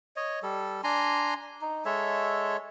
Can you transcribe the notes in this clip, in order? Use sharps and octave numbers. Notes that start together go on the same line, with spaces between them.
C#5 D#5
G3 A4
D4 G#5 A#5 C6
D#4
G#3 A4 C#5 E5